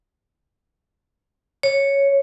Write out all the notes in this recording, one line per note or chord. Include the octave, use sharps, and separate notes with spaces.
C#5